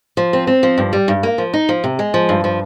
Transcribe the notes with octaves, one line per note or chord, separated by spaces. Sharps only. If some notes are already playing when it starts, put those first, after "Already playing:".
F3
C4
C4
F3
G2
G3
G2
A#3
F3
D#4
F3
C3
G#3
F3
G2
F3